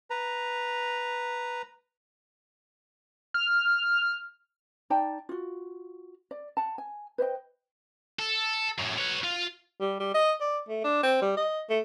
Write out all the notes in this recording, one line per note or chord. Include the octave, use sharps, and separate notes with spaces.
B4 A#5
F6
D#4 D5 G5 A5
F4 F#4
D5
F#5 A5
G#5
B4 C5 D#5 G5
A4
F#2 A2
B4 C#5
F4
G3
G3
D#5
D5
A3
D4
C4
G3
D#5
A3